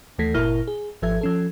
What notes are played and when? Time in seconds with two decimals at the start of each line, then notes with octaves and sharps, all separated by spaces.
0.19 D#2 E3 A3 A4 A#6 B6
0.34 G1 A#2 E4 A#4 F6 A#6
0.67 G#4
1.02 G#1 F3 A4 E5 G#6
1.21 F3 C#4 A4